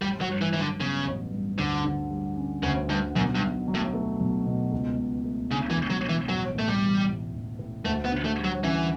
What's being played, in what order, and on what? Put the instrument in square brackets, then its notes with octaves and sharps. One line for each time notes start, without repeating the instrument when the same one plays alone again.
[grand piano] A1 [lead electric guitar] G3
[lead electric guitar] F#3
[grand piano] G2
[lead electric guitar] E3
[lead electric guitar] E3 [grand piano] F#3
[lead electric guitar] D3
[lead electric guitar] C#3 [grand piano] B3
[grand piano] A1
G2
[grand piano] D2 [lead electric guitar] D3
[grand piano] D3
G3
C#4
[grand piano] D2 [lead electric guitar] C#3
[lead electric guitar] G2 [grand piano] D3
[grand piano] B1 [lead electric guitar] F#2
[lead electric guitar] G2
[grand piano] B2
F#3
[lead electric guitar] A2
[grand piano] A3
B1
B2
C#2
B2
A3
[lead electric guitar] C#3 [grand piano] D4
[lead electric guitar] E3
[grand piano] C#2
[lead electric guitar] F#3
[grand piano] B2
[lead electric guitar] E3
[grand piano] A1 [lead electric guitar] F#3
[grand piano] A2 [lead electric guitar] A3
[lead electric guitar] G3
[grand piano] E3
A1
A1
A2
[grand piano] D2 [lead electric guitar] A3
[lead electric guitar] B3
[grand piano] D3
[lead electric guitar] A3
[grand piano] G3
[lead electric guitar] F#3
[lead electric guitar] E3 [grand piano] C#4